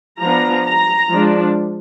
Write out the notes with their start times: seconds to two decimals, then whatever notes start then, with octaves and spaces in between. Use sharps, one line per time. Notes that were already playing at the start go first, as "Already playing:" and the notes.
0.21 F3 B3 D4 A#5
0.66 A#5
1.10 F3 G#3 D4